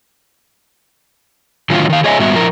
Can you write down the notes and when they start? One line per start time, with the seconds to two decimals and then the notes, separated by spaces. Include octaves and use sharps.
1.70 A2 D3 D#3 F#3 F4
1.90 D#3 F5
2.04 G#4 C#5 D#5 E5 G#5
2.19 G#2 G3 B3 F#4 E5
2.35 F3 E4 A#4